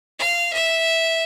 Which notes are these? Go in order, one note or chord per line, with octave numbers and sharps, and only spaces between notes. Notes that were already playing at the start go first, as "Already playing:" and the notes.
F5
E5